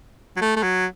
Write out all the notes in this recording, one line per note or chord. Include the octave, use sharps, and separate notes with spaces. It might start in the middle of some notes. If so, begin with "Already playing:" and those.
F#3
A3
A3
F#3